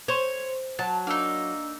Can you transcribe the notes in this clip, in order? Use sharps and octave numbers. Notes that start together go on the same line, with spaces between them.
C5 C#5
F#3 A5
A#3 D4 D#4 E6